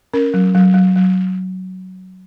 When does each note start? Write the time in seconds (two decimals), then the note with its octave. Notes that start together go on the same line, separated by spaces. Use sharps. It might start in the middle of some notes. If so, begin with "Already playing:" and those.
0.14 C#4 A#4
0.34 F#3
0.55 F#3
0.74 F#3
0.96 F#3